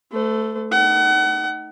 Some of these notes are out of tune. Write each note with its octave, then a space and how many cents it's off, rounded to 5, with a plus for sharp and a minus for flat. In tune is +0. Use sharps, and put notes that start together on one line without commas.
A3 +0 C5 -45
D#4 +0 F#5 +30